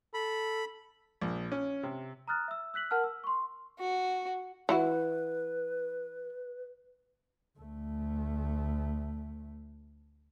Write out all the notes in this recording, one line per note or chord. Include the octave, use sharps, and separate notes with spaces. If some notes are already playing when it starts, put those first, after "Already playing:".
A4 B5
A#1
C#4
C3
A#5 D#6 F6 F#6 A6
E5 E6
E6 F#6 B6 F#7
A#4 F#5 A5 F6
E6
C6 C#6
F#4
E3 E4 F#4 B4
D2 A3